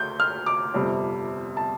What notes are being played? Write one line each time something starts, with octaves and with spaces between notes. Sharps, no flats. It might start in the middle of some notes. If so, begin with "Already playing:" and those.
Already playing: D2 G6
F6
D6
G1 F2 C3 G3
A5